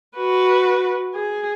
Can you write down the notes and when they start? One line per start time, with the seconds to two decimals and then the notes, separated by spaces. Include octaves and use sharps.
0.17 F#4 B4
1.15 G#4